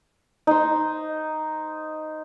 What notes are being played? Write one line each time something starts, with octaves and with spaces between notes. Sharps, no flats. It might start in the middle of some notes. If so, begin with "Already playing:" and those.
D#4 C5